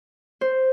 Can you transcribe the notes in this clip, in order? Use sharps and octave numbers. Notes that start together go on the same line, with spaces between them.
C5